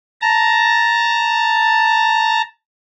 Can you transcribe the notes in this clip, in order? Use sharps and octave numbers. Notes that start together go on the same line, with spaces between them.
A5 A#5